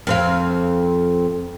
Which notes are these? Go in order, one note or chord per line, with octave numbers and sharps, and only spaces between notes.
F2 C4 F5